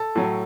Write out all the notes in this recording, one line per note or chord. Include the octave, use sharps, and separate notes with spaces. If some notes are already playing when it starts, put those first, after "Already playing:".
Already playing: A4
A2 F#3